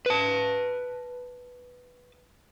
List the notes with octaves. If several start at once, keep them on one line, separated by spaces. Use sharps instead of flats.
B4 A5